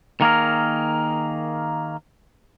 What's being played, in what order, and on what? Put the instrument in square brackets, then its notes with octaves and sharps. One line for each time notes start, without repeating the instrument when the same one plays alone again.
[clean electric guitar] D#3 A#3 G#4 A#4